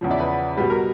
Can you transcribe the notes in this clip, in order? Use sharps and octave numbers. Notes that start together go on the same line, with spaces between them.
E2 C#3 F3
D5 E5
B4
B2 G3 B4
A#4